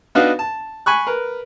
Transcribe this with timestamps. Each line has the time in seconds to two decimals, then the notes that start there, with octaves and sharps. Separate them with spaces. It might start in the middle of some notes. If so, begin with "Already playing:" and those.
0.15 B3 D4 D#4 F#4 B4 F5
0.39 A5
0.86 G#5 B5 C#6 F#6
1.07 A#4 B4